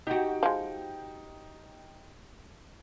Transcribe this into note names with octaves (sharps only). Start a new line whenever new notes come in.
D#4 F#4 G4 G5
F3 G#3